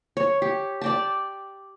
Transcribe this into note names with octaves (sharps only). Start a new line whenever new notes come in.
C#5
G4
D5 G5 A5